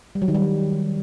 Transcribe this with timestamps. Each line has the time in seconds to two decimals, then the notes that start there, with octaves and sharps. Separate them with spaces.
0.15 G3
0.22 F#3
0.28 D#3
0.35 G3